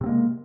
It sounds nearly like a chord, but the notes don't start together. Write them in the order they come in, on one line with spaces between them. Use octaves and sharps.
C3 C4 A#3 G#3